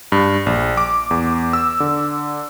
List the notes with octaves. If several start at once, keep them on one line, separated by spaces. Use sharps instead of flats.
G2
A#1
D6
E2
E6
D3